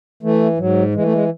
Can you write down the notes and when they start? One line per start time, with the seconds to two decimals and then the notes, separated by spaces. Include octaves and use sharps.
0.23 E3 A3
0.58 G#2 F#3
0.94 E3 G#3
1.04 A3
1.13 G#3